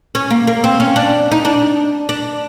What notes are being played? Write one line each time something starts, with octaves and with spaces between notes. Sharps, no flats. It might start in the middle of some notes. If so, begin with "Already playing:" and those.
C#4
A#3
A#3
C4
C#4
D4
D#4
D4
D4